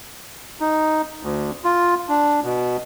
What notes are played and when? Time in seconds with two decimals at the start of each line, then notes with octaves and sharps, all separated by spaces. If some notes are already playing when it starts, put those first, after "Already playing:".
0.60 D#4
1.23 D2
1.64 F4
2.09 D4
2.44 B2